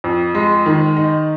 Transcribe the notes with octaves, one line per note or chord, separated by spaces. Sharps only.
F2
G#3
D#3
D#4